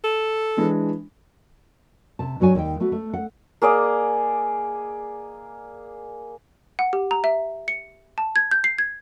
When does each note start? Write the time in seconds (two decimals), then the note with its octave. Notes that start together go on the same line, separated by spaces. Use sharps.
0.04 A4
0.57 E3 G#3 D4
2.19 C3 A5
2.40 G2 F#3 F#4 C#5 G#5
2.55 D#2 D#3 G5
2.80 A3 B3 F#4
2.92 A3
3.14 F#5
3.62 A#3 G#4 D5 D#5
6.79 F#5
6.93 G4
7.11 A#5
7.24 E5
7.68 C#7
8.18 A5
8.36 G#6
8.51 G6
8.64 C7
8.78 G#6